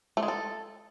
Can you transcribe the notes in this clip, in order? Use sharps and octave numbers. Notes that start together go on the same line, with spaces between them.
A3
G#3
A4